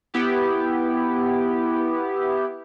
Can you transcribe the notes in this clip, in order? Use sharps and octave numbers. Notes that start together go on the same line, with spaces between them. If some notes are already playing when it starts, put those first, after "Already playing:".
B3 E4 G4